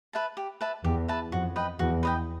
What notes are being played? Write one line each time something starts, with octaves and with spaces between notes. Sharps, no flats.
B4 E5 A5
G4
B4 E5 A5
E2 G4
B4 E5 A5
F2 F#4
B4 D#5 G5
E2 F#4
B4 D#5 G5